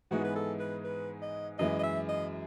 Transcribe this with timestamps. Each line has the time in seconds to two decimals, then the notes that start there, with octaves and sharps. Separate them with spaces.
0.11 G#2 E3 G#3 B3 F#4
0.24 B4
0.35 A4
0.60 B4
0.84 B4
1.22 D#5
1.59 F#2 E3 G#3 D#5
1.79 D#5
1.83 E5
2.09 D#5